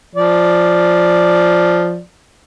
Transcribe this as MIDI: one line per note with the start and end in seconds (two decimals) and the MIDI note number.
0.16 1.99 53
0.16 1.99 74